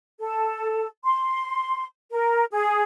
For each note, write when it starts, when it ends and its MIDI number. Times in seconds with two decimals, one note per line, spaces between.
0.20 0.87 69
1.04 1.85 84
2.11 2.44 70
2.52 2.83 68